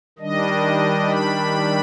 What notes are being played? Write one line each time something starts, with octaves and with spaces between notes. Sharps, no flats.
D#3 G3 D4 D#5
B5